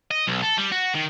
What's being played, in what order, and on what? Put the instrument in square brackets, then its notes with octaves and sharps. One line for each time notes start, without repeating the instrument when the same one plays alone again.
[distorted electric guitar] D#5
B1
A4
G3
F#4
D#3